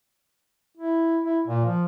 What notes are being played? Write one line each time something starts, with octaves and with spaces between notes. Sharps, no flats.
E4
E4
A#2
F3